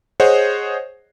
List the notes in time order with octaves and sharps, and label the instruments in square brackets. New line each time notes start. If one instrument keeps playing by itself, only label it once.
[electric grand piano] G#4 C5 C#5 D#5 F#5